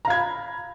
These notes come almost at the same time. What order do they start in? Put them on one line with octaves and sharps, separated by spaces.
A#5 F5 G#6 B5